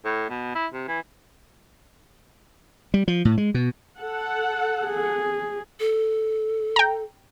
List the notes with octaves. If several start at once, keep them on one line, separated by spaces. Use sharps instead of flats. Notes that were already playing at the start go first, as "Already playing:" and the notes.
A2
B2
E4
C3
E3
G3
F3
A2
G#3
B2
A4 F#5
G#4
A4
G5 A#5